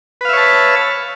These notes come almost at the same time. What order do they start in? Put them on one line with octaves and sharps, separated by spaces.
B4 F5 E5 C#5 A5